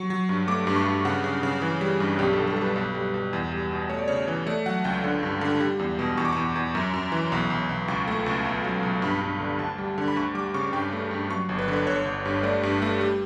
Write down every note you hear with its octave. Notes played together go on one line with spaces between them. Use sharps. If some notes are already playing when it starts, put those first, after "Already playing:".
Already playing: F#3 C#6
F#3
G2
A3 D6
G2
C#6
G2
C#3 F#5
C#3
C#3
E3
G3
G2
B1 G4
A4
B1
A4
G3 B4
B1
G3
B1
E2
G3
B2
A3 C#5
D5
C#3 C#5
E3
A3 D5
F#3 F#5
C#2 G5
D3
G2
D3
G3
E2
B2
E2 C#6
D6
E2 C#6
E2
F#2
F#2
E3
B1
B1
B1
C#2 C#6
A3
C#2
B1
F#3
B1
G2 B5
G2
D3
D2 A5
G3
D3
B5
D2 C#6
G3 D6
C#3 C#6
G2 G5
A3
G2
F#3 C#6
G1
B4
D3
B4
G1 C#5
G1
G2
A3 D5
G2
A3
G3